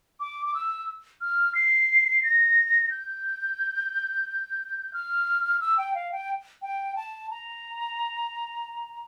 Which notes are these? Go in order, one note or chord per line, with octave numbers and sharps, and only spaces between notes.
D6
D6
E6
F6
C7
A#6
G6
F6
E6
G5
F5
G5
G5
A5
A#5